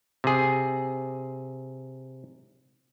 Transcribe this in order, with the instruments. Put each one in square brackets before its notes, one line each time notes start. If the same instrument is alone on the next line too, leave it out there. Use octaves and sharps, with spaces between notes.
[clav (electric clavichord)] C3 G#4